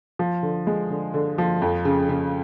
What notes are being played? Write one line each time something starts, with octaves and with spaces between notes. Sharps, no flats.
F3
D3
G#3
D3
D3
F3
F2
C#3
C#3